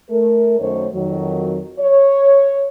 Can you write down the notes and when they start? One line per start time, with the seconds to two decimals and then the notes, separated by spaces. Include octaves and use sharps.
0.11 A3 A#4
0.59 F#2 D#3 A3 C5 C#5
0.94 F2 D#3 F#3
1.80 C#5